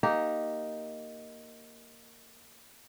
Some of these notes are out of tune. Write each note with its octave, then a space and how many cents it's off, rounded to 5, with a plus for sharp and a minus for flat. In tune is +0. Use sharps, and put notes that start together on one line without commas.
A#3 +0 D#4 +0 G4 -15